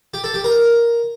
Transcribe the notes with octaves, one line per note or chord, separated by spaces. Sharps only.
G4
A4
G4
A#4